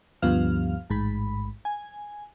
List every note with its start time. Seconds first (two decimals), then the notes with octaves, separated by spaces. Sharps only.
0.22 D2 G2 F3 B3 F5 F6
0.90 A1 G#2 B5
1.65 G#5